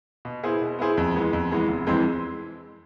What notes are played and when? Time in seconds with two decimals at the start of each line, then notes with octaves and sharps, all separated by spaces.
0.25 B2
0.43 B3 E4 G#4 C5
0.61 B2
0.79 B3 E4 G#4 C5
0.97 F2
1.14 E3 G#3 B3
1.33 F2
1.51 E3 G#3 B3
1.68 F1
1.87 F2 E3 G#3 C4